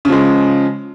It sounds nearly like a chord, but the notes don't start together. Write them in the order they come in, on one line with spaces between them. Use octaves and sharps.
C#3 F3 G#3